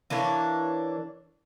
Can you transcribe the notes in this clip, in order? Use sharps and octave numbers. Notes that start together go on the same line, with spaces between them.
E3 A#3 D4 C#5